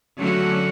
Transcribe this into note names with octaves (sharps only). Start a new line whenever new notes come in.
D3 F#3 A3 C#4 F#4